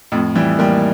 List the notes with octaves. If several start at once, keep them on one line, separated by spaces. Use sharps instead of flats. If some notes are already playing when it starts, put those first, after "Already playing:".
F2 A2
E3 G3
G3 A#3